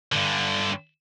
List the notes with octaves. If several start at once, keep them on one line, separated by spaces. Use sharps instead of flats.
G2 D3